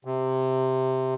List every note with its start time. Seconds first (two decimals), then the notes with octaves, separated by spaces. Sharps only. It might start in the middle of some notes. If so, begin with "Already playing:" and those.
0.05 C3